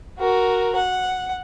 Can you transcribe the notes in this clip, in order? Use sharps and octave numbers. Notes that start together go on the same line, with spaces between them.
F#4 A#4
F#5